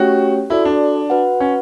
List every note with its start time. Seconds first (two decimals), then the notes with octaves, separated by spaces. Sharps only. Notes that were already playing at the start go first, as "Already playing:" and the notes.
Already playing: A3 C#4 F#4 G4 C#5 G5
0.50 E4 F#4 A4 D5
0.65 D4
1.10 F#4 B4 F#5
1.40 C#4